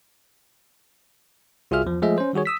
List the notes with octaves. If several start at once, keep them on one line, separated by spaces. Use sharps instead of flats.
C2 F4 F#4 G#4 E5 F6
E2 F3
F3 G#3 A3 G#4 D#5 E5
C#4 C5
D#3 G3 F#4 G#4 C#5
D#6 E6 B6